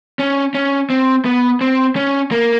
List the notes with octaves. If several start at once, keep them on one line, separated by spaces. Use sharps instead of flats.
C#4
C#4
C4
B3
C4
C#4
A#3